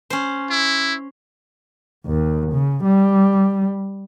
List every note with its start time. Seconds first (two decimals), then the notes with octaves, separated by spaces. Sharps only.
0.10 C#4 C5
0.50 E4
2.06 D#2
2.53 C#3
2.84 G3